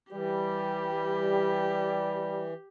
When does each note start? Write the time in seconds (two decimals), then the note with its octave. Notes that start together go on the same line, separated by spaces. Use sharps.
0.12 E3 G3 G4